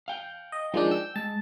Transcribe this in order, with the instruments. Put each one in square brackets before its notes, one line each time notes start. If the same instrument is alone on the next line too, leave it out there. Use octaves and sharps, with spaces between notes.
[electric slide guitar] F5 G5
[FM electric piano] D#5
[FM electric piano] F3 G#3 D4 [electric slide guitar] D#4 A#4 G5
[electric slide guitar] G5 [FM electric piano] E6
[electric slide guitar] G#3 [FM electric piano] A5